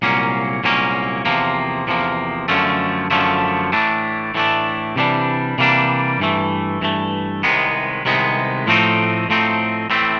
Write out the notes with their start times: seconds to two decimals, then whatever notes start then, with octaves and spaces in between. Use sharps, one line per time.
0.02 C2 A#2 F#3 A#3 C#4
0.64 C2 A#2 F#3 A#3 C#4
1.25 E2 C3 F3 A#3
1.87 E2 C3 F3 A#3
2.48 F#2 D3 F3 A3 C#4
3.11 F#2 D3 F3 A3 C#4
3.72 A2 E3 A3 D4
4.34 A2 E3 A3 D4
4.96 C3 E3 G3 A#3 D4
5.58 C3 E3 G3 A#3 D4
6.20 G2 E3 A3
6.81 G2 E3 A3
7.43 C2 C3 D#3 G#3 B3
8.05 C2 C3 D#3 G#3 B3
8.67 A2 F3 A3 C4 D#4
9.29 A2 F3 A3 C4 D#4
9.90 A2 E3 A3 C4